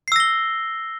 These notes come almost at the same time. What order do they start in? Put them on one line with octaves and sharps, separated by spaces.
C7 E6 A#6 G7